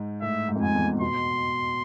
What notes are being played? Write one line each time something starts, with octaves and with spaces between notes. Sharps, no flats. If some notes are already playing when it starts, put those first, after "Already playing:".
Already playing: G#2
A2 E5
G#2
F2
G#2 G#5
E2
B2 C6